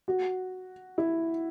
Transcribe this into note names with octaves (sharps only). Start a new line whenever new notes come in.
F#4
E4